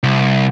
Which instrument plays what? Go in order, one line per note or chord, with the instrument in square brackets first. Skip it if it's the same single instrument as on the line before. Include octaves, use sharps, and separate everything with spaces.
[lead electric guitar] C2